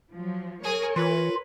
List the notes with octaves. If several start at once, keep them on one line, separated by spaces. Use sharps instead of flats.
F3 F#3
G#4 A#4 C#5 G#5
E3 F4 B4